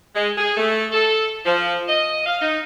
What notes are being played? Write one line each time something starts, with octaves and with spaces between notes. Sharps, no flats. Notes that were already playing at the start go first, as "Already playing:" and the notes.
G#3
G#4
A3
A4
F3
D#5
F5
D#4